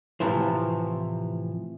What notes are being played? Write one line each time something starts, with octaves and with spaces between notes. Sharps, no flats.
A2 C3 E3 F3